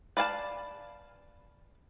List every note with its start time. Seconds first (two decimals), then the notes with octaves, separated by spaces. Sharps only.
0.17 B4 D5 F5 G#5 A5